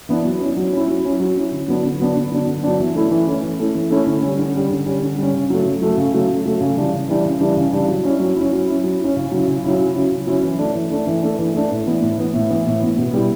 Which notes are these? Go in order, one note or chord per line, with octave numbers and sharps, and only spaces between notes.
E3 B3 D4
F#3
C#4 E4
F#3
C#4 E4
F#3
C#4 E4
F#3
C#4 E4
D3
F#3 B3 D4
D3
F#3 B3 D4
D3
F#3 B3 D4
D3
F#3 B3 D4
E3
A3 C#4 E4
E3
A3 C#4 E4
E3
A3 C#4 E4
E3
A3 C#4 E4
D3
G3 C#4
D3
G3 C#4
D3
G3 C#4
D3
G3 C#4
C#3
F#3 A3
C#3
F#3 A3
C#3
F#3 A3
C#3
F#3 A3
C#3
E3 G3 D4
C#3
E3 G3 D4
C#3
E3 G3 D4
C#3
E3 G3 D4
F#3
C#4 E4
F#3
C#4 E4
F#3
C#4 E4
F#3
C#4 E4
C#3
F#3 C#4 E4
C#3
F#3 C#4 E4
C#3
F#3 C#4 E4
C#3
F#3 C#4 E4
E3
A3 D4
E3
A3 D4
E3
A3 D4
E3
A3 D4
A2
E3 B3
A2
E3 B3
A2
E3 B3
A2
E3 B3
B2
G3 B3 E4